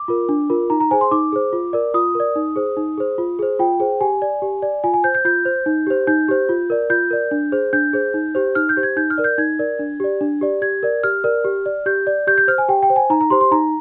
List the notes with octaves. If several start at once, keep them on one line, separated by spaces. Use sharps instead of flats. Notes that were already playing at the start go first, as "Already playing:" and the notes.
Already playing: D6
F4 A#4
D4
F4 A#4
D#4 A#5
A#5
G#4 C5 G#5
C6
D#4 D6
G#4 C5
F4
A#4 D5
F4 D#6
A#4 D5
D#4
G#4 C5
D#4
G#4 C5
F4
G#4 C5
F4 G5
G#4 C5
G4 G#5
D5
G4
D5
F4 G#5
G#5
C5 G6
G6
F4 G6
C5
D#4
G4 C5
D#4 G6
G4 C5
F4
A#4 D5
F4 G6
A#4 D5
D4
G#4 C5
D4 G6
G#4 C5
D#4
G4 C5
D#4 F6
G6
G4 C5
G#6
D#4 G6
F6
A#4 D5
G6
D#4 G#6
A#4 D5
D4
G4 D5
D4
G4 D5
G4 G#6
A#4 D5
G4 F6
A#4 D5
G4
D5
G4 G6
D5
G4 G6
G6
C5 F6
G#5
G4 G5
G5
C5
G#5
D#4 A#5
A#5
G4 C5 C6
C6
D#4 A#5